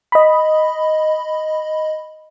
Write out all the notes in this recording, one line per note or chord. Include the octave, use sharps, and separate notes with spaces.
D#5 B5